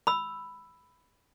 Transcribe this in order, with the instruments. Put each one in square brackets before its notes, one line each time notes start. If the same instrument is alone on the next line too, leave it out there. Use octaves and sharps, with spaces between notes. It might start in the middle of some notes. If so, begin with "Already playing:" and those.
[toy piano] B5 E6